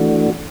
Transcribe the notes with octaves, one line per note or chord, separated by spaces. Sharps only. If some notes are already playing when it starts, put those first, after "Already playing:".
Already playing: E3 A3 D4 F#4